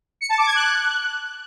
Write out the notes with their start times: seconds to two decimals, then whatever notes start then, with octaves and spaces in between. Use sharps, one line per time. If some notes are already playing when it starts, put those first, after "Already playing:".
0.21 C#7
0.29 A5
0.38 D6
0.46 G#6
0.55 F#6